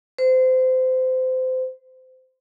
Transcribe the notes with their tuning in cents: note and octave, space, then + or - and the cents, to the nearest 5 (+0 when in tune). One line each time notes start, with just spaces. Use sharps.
C5 -25